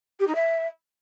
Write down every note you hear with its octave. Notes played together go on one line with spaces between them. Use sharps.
G4
D#4
E5